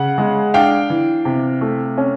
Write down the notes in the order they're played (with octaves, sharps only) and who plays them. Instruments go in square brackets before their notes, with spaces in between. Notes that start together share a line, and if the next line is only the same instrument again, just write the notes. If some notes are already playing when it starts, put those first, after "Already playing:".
Already playing: [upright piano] C#3 F#5
G#3
D4 F5 G5
E3
C3
A3
C#4